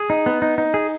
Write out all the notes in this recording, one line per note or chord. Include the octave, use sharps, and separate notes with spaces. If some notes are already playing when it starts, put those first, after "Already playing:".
Already playing: G#4
D#4
B3
D#4
D#4
G#4